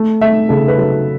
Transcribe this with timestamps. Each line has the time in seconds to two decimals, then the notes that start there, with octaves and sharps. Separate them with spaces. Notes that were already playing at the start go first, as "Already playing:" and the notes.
Already playing: A3
0.21 A3 E5
0.49 C#3 A4
0.68 B4
0.78 F#3 A4